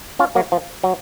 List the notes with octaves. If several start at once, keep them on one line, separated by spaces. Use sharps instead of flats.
C#4 F4
F#3 A#3
F3
F#3